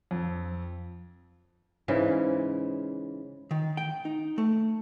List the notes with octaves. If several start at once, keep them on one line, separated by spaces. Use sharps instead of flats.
F2
G#2 C#3 E3
D#3
G5
D#4
A3